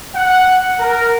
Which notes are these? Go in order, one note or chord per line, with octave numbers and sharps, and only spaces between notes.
F#5
A#4